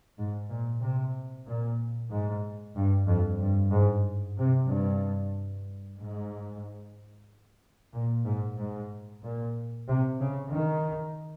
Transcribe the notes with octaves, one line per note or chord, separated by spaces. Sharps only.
G#2
A#2
C3
A#2
G#2
G2
F2
G2
G#2
C3
G2
G#2
A#2
G#2
G#2
A#2
C3
C#3
D#3